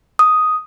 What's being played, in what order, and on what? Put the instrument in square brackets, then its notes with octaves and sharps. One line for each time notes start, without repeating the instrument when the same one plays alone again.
[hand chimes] D#6